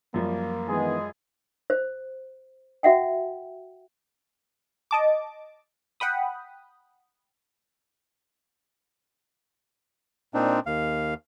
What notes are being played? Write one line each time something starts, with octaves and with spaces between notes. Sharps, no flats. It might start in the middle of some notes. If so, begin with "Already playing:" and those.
F#2 F3 G3 A#3
D#3 E3 G#3 B3 G#4
C5
F#4 E5 F#5 G5
D#5 A5 D6
F#5 G5 B5 D#6
A#2 C4 D4 D#4
D#2 F5